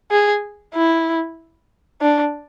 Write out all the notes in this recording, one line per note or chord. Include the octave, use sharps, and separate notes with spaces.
G#4
E4
D4